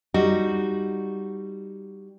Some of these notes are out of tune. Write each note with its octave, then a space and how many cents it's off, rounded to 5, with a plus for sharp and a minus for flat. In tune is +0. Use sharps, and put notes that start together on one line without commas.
G3 +0 D#4 +0 F#4 +0